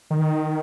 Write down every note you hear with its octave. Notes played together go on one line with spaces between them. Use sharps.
D#3